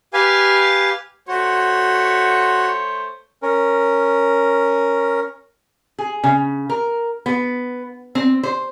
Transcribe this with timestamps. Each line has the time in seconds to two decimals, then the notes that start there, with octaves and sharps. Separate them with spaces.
0.13 G4 B4 F5 G#5
1.28 A3 F#4 C5 C#5
3.42 C#4 A#4
5.99 G#4
6.24 C#3
6.70 A#4
7.26 B3
8.15 C4
8.43 C5